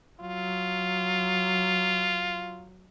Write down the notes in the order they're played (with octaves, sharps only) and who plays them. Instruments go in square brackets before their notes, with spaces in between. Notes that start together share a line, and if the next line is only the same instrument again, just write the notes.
[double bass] F#3 [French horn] F4